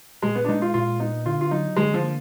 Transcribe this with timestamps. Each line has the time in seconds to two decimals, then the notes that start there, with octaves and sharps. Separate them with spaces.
0.22 A#2 G#3
0.35 B3
0.45 D4
0.49 G#3 D#4
0.62 F4
0.74 A#2 F4
1.00 B3 D#4
1.26 D3 F4
1.41 F4
1.51 F#3 D#4
1.77 D3 G#3
1.94 F3
2.03 A#3